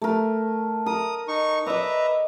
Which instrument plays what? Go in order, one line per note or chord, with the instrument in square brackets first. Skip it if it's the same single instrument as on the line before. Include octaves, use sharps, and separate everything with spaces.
[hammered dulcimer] A3 A#4
[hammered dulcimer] A#4 [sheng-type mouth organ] D#6
[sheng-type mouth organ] D#4 C#6
[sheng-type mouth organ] B4 E5 A#5 [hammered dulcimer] D#5 D6